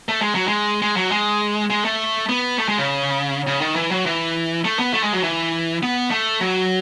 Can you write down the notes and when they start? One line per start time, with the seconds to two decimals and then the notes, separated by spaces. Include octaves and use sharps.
0.09 A3
0.22 G#3
0.35 F#3
0.48 G#3
0.82 G#3
0.97 F#3
1.11 G#3
1.70 G#3
1.85 A3
2.29 B3
2.58 A3
2.68 G#3
2.78 C#3
3.47 C#3
3.61 D#3
3.76 E3
3.91 F#3
4.06 E3
4.65 A3
4.79 B3
4.94 A3
5.03 G#3
5.13 F#3
5.23 E3
5.83 B3
6.11 A3
6.41 F#3